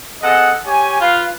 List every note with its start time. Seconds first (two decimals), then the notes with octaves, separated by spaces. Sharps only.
0.23 C4 G#4 A4 D#5 F#5
0.66 G4 C#5 G#5
1.01 F4 B4 F5